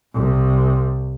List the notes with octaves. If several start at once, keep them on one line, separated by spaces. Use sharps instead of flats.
C2